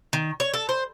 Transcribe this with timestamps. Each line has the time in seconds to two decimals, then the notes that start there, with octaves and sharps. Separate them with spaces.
0.13 D#3
0.40 C#5
0.54 A4
0.69 C5